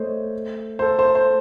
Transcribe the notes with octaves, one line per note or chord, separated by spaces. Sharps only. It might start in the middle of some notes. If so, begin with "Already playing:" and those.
Already playing: A3 C5 C#5 D#5
C5
A4
C5
C5